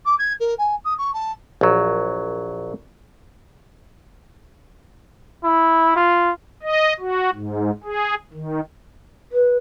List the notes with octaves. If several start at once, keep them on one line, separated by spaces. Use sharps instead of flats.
D6
G#6
A#4
G#5
D#6
C#6
A5
A#1 F#3
E4
F4
D#5
F#4
G#2
G#4
D#3
B4